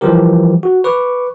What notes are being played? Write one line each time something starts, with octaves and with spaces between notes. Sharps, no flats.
E3 F3 G3 G4 A#4
F#4
B4 C#6 D6